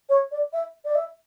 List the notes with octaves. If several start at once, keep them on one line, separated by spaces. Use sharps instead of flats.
C#5
D5
E5
D5
E5